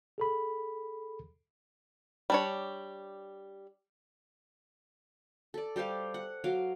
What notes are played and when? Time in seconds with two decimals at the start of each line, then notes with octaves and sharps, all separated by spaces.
0.18 G#4 A4 B5
2.30 G3 D4 C#5
5.54 A4 D5
5.76 G3 G4 C5 F5
6.14 F#5
6.44 F#3 F5 D6